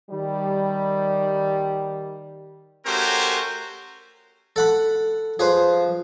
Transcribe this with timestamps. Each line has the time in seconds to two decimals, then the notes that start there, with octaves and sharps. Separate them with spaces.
0.10 D#3 G3
2.86 A3 C#4 F#4 G4 A#4 C5
4.56 A4 F#5 B5
5.39 F3 G#4 B4 C5